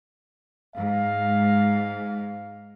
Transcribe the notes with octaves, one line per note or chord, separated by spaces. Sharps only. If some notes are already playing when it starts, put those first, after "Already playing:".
G#2 F5